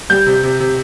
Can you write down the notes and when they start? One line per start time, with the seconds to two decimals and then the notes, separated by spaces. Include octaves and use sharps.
0.10 G3 G6
0.26 C3
0.43 C3
0.60 C3